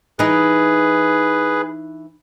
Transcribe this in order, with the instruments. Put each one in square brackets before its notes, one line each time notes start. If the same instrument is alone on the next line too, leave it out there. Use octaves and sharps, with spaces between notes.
[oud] E3 D#4 [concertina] G#4 B4